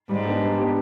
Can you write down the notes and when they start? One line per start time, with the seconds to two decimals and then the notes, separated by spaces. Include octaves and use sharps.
0.09 G#2 G3
0.25 B3 D4 G4
0.42 G3
0.58 B3 D4 G4